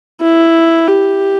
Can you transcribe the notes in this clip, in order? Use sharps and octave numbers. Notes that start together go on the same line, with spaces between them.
E4
G4